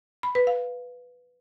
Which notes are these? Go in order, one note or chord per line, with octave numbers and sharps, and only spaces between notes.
B5
B4
F5